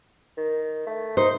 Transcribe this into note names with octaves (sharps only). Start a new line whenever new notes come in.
D#3
A3
D#4 C5